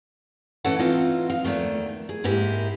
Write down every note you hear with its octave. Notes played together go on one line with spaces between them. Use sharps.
A2 E3 C#4 A4 F#5
E3 C4 D#4 F4
F5
E2 D#3 A3
G#4
G#2 A#3 E4 G4 G#4